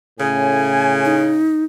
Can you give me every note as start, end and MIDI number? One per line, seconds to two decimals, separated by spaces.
0.20 1.34 45
0.20 1.53 49
0.20 1.34 61
0.20 1.15 80
1.05 1.64 63